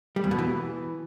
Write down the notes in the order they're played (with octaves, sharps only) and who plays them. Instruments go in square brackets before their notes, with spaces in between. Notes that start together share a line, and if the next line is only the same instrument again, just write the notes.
[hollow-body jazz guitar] G3
E2
B2
E3